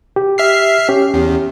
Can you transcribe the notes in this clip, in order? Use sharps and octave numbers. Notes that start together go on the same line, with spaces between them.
G4
E5 F6 C7
C#4 G4
E2